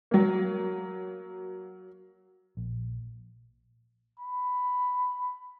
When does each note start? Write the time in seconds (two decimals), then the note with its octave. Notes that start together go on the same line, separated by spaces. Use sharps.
0.11 F#3 A#3
2.57 A#1
4.19 B5